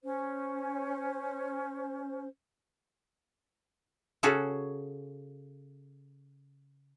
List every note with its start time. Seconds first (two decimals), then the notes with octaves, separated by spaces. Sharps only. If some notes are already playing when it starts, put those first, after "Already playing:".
0.04 C#4 C5
4.23 C#3 C#4 F#4 G#4 A4